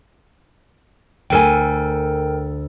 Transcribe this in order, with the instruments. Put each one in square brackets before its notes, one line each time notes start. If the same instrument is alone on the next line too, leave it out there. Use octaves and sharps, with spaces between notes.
[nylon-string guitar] D2 A4 G#5 [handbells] A#4 G5